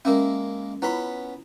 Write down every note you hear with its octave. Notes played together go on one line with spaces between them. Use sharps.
G#3 A#3 C#4 E4 A#4
B3 C#4 E4 F4 B5